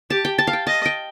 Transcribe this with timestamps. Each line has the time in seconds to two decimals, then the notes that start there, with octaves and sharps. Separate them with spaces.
0.10 G4 A5
0.25 G5
0.38 A5
0.47 F5
0.53 G5
0.67 D#5 A5
0.86 G5